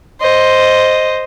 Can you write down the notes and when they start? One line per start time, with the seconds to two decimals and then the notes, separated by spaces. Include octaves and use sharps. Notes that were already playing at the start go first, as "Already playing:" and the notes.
0.21 C5 D#5